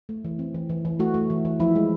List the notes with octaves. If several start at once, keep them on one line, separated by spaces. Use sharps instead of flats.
A3
E3
C4
E3
E3
E3
A3 F#4
A3
E3
E3
F3 E4
G#3